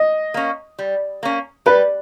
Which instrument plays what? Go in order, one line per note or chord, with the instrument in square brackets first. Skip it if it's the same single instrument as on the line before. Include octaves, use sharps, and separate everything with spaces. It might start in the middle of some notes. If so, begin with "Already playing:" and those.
Already playing: [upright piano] D#5
[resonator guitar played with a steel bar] A#3 C#4
G3
A#3 C#4
[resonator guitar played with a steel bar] G3 [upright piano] B4